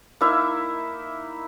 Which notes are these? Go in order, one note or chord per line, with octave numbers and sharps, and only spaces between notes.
A#3 D#4 E4 E5